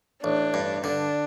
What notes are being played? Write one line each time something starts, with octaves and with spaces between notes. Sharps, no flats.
A1 D4
G2
D3 D4